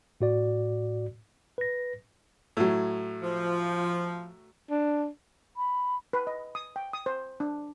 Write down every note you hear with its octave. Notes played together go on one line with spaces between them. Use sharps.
A2 F#4 D5
B4 A#6
A2 F#3
F3
D4
B5
B4
D#5
D#6
G5
D#6
C5
D4